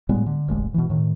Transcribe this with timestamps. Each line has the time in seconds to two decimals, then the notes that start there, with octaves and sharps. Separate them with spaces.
0.09 A2 G3 G#3 B3
0.26 D3
0.48 E1 A1 G#3
0.74 B2 E3
0.90 A2 D#3